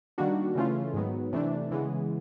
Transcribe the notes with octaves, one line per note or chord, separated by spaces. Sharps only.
D#3 G3 A#3 D4 F#4
C#3 E3 A3 C#4 F4
G#2 D#3 F#3 B3
C3 E3 A3 D4
C#3 E3 G#3 B3